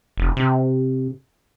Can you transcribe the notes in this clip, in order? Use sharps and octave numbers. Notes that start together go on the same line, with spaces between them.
F1
C3